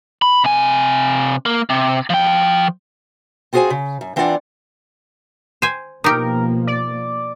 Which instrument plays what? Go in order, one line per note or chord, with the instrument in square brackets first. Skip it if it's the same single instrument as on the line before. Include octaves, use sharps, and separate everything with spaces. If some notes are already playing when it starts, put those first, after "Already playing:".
[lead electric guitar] B5
C3 G#5
A#3
C3
F3 G5
[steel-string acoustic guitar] C4 F4 F#4 G#4 C5 G#5
C#3
F#2
E3 C4 D4 F4 D5 F#5
[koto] C5 G#5
[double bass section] B2 F3 A#3 [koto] D#4 G4 [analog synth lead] A#4
[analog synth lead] D5